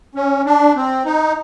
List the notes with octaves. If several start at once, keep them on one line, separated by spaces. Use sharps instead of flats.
C#4
D4
C4
D#4